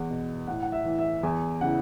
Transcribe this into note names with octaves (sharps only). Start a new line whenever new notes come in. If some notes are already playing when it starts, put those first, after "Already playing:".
Already playing: E2 F#5
B2
A2 F#5
F#5
E5
E3
E5
E2 G#5
C#3 E3 F#5